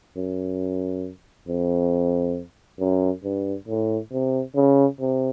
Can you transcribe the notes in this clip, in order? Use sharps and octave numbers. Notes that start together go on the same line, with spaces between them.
F#2
F2
F#2
G2
A2
C3
C#3
C3